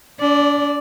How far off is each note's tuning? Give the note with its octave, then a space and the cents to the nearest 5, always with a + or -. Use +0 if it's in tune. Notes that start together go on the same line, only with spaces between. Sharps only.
D4 -40 D5 +0